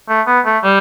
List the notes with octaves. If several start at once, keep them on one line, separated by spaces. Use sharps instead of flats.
A3
B3
A3
G3